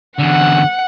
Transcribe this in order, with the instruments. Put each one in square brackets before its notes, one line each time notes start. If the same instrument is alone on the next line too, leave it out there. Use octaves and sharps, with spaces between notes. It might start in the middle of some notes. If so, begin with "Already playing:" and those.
[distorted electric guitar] E2 D3 [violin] F#5